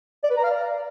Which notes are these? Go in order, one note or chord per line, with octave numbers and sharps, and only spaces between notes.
D5
B4
A#5
F5
D5